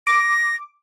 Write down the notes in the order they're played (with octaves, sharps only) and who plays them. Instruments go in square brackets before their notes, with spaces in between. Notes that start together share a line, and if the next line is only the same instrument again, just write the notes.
[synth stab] D6 [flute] A#6